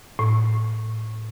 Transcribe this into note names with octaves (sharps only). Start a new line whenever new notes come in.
A2